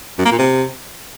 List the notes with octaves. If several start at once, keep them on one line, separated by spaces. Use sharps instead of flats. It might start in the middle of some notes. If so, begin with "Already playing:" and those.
F#2
A#3
A#2
C3